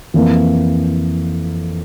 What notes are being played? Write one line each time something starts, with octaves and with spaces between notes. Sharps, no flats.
F2 E3 A#3